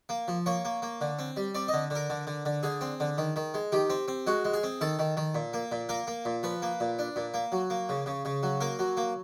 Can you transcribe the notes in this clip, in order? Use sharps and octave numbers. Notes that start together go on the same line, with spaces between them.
A#3
F3
A#3 C#5
A#3
A#3
D3
C4
G3
C4 D5
D#5
D3
D3 A#4
D3
D3
D3
D3 G#4
C4
D3
D#3
D#3
G#3
D#3 G4
C4
C4
G#3 F#4
G#3
G#4
C4
D#3 A4
D#3
D#3
A#2
A#3
A#2
A#3 A#4
A#3
A#2
F3 B4
A#3
A#2
D4
A#2
A#3
F#3
A#3
C#3
C#3
C#3
F#3
A#3 A#4
F#3
A#3